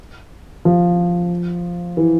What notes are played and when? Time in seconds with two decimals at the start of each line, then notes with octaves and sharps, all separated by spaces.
0.65 F3
1.97 E3